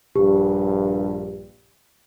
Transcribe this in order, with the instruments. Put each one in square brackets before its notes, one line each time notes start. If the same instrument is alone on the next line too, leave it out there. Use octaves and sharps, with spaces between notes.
[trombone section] A#1 G2 [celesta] G4